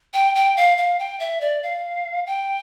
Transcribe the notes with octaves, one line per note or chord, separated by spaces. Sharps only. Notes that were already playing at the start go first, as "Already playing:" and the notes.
G5
G5
F5
F5
G5
E5
D5
F5
G5